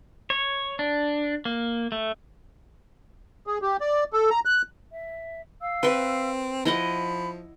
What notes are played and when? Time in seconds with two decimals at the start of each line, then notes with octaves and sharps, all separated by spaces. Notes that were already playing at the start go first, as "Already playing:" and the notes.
0.30 C#5
0.79 D4
1.45 A#3
1.92 A3
3.47 G#4
3.62 G4
3.81 D5
4.13 A4
4.30 A#5
4.45 F#6
4.92 E5
5.61 F5 E6
5.83 C4 B4 E5
6.65 F3 E4 D#5 F#5 B5